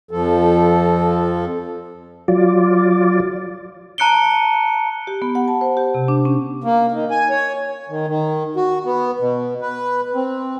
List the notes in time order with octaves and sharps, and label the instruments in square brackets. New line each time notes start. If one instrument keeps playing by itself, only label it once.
[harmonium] F2 F3 A4
[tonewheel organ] F#3 F4 D5
[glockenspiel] A5 A#5 F#6 C#7 D7 G7
[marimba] G4
B3
F#5
A5
C5
G4
C3
D4
C#4
[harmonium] A#3
D#3
G#5
C#5
D#3
D#3
F#4
B3
B2
B4
C4